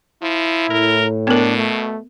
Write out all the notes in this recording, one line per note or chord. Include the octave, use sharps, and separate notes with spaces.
F3 E4
A2 A#4
B2 B3 D4 A#4
A3